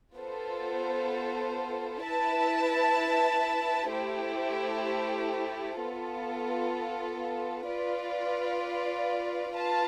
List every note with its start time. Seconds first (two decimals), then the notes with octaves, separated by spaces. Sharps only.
0.16 B3 F4 A4 C5
2.02 E4 B4 E5 A5
3.91 A3 E4 G4 C5
5.78 B3 F4 A4
7.66 F4 B4 D5 F5
9.54 F4 B4 F5 A5